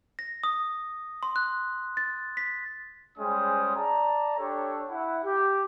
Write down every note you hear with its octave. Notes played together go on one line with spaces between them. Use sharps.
A#6
D#6
C6
F#6
A6
B6
G3 G#3 C#4 C5 G5 D#6
D5 A5 A#5
D4 G4 A4 C#5
E4 F#5
G4